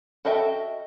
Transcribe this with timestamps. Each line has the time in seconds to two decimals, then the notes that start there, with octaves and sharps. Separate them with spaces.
0.25 F#4 A4 D#5 E5 G5